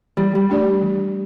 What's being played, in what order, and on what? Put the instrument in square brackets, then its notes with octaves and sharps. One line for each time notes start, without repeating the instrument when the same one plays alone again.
[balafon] E3 [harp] G3
[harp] G3
[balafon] A3 D4 G4 D5
E3